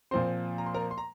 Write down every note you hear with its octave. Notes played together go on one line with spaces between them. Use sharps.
A#2 F3 C4 C5 C6
A#5
C6
A#4 A#5
C6
A#5